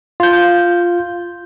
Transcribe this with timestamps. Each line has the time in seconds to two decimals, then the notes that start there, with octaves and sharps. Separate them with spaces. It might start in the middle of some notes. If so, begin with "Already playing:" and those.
0.20 F4 G6